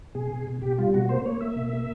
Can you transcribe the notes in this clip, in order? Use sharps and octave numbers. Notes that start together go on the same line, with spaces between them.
B2 G#4
B2
B2
B2 G4
G3 F4
B2 F#4
A#3 C5
A#3 C#5
A#3 E5
B2
A#3